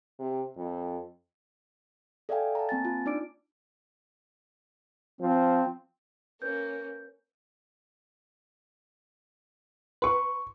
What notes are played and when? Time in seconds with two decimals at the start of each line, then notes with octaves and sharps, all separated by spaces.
0.19 C3
0.57 F2
2.29 A4 D5 E5 F5 G5 G#5
2.55 A5 A#5
2.69 A#3 C4 G#5 A6
2.85 F4
3.06 D4 D#4 D5 D6 D7
5.21 F3 C4
6.42 A#3 C#4 B4 G6
10.02 B4 C6 C#6